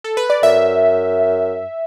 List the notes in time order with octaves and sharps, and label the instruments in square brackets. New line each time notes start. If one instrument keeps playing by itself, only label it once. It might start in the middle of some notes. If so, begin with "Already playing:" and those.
[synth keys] A4
B4
D5
[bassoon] F#2 [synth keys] E5